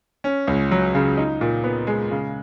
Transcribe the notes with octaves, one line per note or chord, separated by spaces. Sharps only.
C#4
C#2
F#3
C#3
D#4
A#2
B3
G#3
C#3